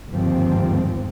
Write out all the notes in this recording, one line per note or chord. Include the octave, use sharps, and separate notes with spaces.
G1 D#2 G#2 F3 C4